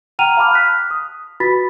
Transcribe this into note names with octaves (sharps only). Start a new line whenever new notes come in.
F#5 G5 A#5 F6 D#7 F7
F5 A5 B5 D6 F6
F6 F#6 B6
D#6
F4 F#4 B4 B5 A6 B6